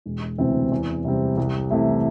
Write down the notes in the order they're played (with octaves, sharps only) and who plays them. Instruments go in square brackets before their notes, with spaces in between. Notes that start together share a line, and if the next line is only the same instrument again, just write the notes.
[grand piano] E1
D2 C3 E3 C4
E2
C3 G3 C4
C2
C3 E3 A3 E4